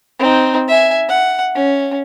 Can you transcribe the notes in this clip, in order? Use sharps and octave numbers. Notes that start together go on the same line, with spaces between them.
C4 D#4
E5 G#5
F#5
C#4